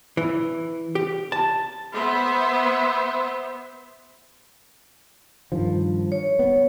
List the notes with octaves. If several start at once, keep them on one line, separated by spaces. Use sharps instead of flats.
E3
G4
A5
B3 C5 E5
G2 D#3 F3
C#5
B3